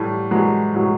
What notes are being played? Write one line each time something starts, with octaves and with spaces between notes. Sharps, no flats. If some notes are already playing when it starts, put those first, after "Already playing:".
Already playing: A2 E3 G3 A3
E3 F#3 G#3
A2 F#3 G#3